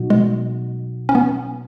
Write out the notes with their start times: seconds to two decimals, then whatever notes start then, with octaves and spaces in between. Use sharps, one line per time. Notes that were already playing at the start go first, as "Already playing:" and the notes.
Already playing: B2 F#3 D#4 F#4
0.10 G#3
1.09 C#4
1.15 B3